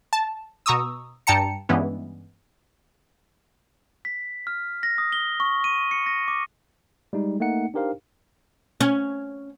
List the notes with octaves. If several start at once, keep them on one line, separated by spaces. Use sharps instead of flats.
A5
B2 A#5 C#6 D#6 E6
G2 G5 A5 A#5 C#7
G2 E3 G#3 B3 C#4
B6
F6
A#6
D#6
G7
C#6
D#7
C#7
A#6
D6
G3 G#3 D#4
A3 A#3 D#4 F#5 C#7
D4 D#4 G4 A#4 C5 F5
C#4